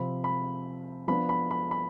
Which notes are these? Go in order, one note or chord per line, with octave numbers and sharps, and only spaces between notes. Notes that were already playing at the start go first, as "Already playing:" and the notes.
Already playing: C3 F3 C4 B5
B5
F3 B3 D4 B5
B5
B5
B5